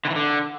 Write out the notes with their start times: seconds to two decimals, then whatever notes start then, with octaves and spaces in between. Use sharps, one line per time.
0.05 D3
0.10 E3
0.16 D3